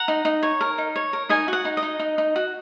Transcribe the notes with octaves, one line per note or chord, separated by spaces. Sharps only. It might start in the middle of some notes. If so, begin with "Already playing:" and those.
Already playing: F#5 A#5
D#4
D#4
C#5
A#4
D#4
C#5
A#4
D#4 D#5 G#5
F#4 F#5
D#4
D#5
D#4
D#4
D#4
F#4